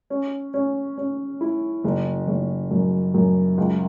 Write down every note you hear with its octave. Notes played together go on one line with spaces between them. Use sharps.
C#4
C#4
C#4
E4
F#1
F#1
F#2
F#2
C#2